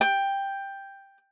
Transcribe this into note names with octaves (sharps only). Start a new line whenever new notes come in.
G5